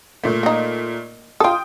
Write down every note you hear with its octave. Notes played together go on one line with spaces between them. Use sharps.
A#2 A3
A#3 D#4
F4 A4 G5 D#6